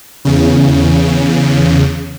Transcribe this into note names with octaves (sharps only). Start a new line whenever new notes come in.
E2 C#3